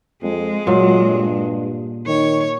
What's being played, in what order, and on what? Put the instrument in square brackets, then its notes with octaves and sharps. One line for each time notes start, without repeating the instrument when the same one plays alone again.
[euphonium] F2 [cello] G#3
[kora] A#2 [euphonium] F#3
[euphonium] G2
[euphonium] D#3 [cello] C#5